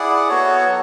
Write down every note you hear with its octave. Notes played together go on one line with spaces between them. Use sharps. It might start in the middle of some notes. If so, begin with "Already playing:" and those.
Already playing: E4 G#4 D5 F#5
B3 F#4 A4 C#5
F#3